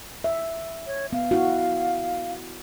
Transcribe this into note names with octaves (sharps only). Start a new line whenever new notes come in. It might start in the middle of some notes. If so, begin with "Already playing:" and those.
E5
C#5
B3 F5
E4 F#4